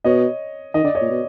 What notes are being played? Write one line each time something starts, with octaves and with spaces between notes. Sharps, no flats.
B2 C#5 D#5
D#3 D#5
D3 D5
C#5 D#5
A#2
B2